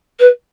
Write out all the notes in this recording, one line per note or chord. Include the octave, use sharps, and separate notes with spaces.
B4